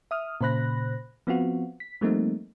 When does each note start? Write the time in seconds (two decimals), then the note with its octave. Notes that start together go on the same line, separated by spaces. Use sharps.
0.11 E5 D#6 F6
0.41 A#2 C#3 C5 B5 F#6 A#6
1.27 F3 B3 C4 F4 F#4
1.80 B6
2.01 F3 G3 A3 A#3 C4 D#4